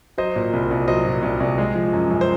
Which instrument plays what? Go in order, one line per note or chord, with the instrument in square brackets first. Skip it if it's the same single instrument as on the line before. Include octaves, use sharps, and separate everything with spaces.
[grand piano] F#3 C5 D#5
A#2
C2
C2
F#3 C5 D#5
A#2
C2
C2
G#3
F3
F#2
F#2
C5